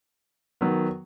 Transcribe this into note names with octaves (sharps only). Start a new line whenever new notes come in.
D#3 F#3 B3